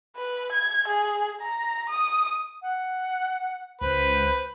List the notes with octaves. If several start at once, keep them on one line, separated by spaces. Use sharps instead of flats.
B4
G#6
G#4
A#5
D#6
F#5
C#2 B4 C5